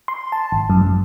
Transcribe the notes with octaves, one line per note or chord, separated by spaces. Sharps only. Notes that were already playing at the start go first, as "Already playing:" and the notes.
C6
A5
G#1
F#2
F#2